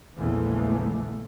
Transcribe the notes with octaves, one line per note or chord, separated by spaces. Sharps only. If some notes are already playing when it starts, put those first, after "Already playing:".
A#1 E2 C#3 E3 G#3 A3